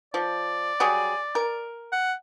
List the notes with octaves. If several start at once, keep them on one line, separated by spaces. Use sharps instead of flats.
F3 D5
F#3 G3 G#4
A#4
F#5